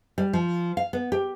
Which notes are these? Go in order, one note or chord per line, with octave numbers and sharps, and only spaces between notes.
G3
F3
F5
B3
G4